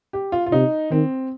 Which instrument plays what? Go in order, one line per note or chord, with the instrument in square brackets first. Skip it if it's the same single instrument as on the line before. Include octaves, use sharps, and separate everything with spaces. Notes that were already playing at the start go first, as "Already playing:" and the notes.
[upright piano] G4
F4
F4
[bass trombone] C3 [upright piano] D#4
[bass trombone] D#3 [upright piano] C4